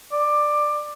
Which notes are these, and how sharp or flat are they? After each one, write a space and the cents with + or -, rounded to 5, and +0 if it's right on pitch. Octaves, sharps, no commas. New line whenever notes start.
D5 +15